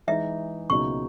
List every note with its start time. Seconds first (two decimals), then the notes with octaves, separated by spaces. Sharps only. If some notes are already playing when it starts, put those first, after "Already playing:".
0.07 E3 G#3 D#4 E5
0.70 C#2 B2 F#3 A#3 D#4 C#6